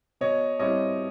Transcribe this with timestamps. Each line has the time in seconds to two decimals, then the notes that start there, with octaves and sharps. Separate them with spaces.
0.21 B2 C#5 D#5
0.59 G3 C4 E4 C#5 D#5